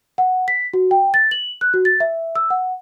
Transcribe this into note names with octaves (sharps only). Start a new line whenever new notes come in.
F#5
B6
F#4
G5
A6
F#7
F#6
F#4
A6
E5
E6
F#5